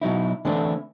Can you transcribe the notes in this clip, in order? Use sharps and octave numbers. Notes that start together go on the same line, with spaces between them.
B2 F#3 D#4 E4
D3 E3 A3 C4 D4 E4